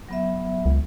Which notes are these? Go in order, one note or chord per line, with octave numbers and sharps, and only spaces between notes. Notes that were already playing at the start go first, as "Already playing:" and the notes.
F#3 B3 E5
C#2